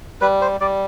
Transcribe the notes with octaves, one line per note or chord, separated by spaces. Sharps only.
G3 B4
C5
G3 D5